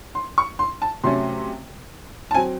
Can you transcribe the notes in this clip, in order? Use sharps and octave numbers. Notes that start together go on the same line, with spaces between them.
C6
C#6
C6
A5
C3 F#3 A3 C#4 C6
A5
F#3 C4 G#5